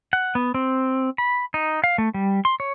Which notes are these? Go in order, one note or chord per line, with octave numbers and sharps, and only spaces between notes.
F#5
B3
C4
B5
D#4
F5
A3
G3
C6
C#5